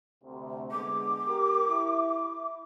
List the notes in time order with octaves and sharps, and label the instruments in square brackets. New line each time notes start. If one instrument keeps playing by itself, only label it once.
[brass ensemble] D2 C3
[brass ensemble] D3 G#3 B3 [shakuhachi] D6
[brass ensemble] G4 A#4
E4